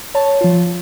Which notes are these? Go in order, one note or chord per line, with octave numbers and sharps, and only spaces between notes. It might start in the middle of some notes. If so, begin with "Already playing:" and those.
C#5 A5
F3 F4